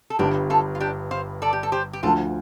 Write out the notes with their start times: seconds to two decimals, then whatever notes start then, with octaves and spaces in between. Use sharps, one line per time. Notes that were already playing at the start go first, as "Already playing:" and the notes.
0.10 A4
0.19 G1 G2 G3 D4 G4
0.50 F4 A4
0.75 F4
0.80 D4 G4
1.11 C5 F5
1.42 A4 D5
1.53 G4
1.63 A4
1.72 G4 C5
1.93 G4
2.03 D2 D3 F3 F4 A4